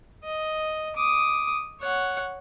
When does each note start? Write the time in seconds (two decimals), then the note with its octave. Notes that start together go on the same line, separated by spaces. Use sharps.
0.24 D#5
0.96 D6 D#6
1.81 C#5 F#5